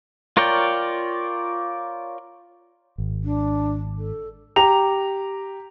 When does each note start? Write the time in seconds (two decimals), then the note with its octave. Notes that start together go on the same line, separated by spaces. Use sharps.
0.37 F4 A#4 C#5 D5 G5
2.98 G#1
3.24 D4
3.98 A4
4.56 G4 A#5 F7